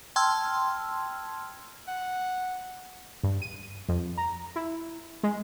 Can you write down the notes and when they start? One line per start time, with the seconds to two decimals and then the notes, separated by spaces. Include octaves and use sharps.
0.16 G5 A5 C6 E6 F6 G#6
1.87 F#5
3.23 G2
3.42 D#7
3.89 F2
4.18 A#5
4.56 E4
5.23 G#3